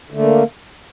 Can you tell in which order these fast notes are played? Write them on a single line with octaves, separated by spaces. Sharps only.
D3 A3 A#3